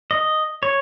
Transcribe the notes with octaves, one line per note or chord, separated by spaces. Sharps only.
D#5
C#5